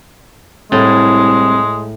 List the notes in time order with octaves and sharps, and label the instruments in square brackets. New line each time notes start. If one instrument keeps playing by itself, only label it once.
[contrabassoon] C2 [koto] A2 [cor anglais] G#3